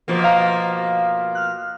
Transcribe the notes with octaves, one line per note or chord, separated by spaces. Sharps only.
B2 F3 A#3
F5 A#5
F6 F#6